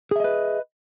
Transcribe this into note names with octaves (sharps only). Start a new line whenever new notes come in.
G#4 B4 D#5 E5